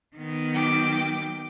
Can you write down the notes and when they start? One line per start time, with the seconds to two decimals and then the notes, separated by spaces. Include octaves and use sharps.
0.16 D#3 B3
0.54 F#3 G5 D6